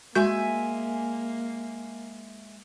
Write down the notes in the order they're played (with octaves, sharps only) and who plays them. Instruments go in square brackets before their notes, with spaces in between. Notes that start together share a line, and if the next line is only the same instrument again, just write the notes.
[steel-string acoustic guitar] G#3 E5 G#5 [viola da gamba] A#3 [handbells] F#4 G6